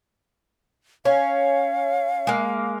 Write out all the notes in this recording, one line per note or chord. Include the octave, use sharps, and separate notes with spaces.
C#4 F5
G#3 A#3